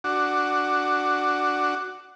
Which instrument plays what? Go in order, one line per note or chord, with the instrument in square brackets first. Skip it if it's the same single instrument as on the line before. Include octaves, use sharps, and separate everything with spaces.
[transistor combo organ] D4 F#4